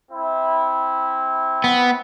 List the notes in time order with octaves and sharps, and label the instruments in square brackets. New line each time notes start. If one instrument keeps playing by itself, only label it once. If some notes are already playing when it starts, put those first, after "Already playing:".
[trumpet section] C4 E4
[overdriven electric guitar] B3